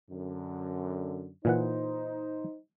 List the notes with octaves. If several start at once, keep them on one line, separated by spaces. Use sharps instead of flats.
F#2 D3
A#2 E3 D#4 C5 F#5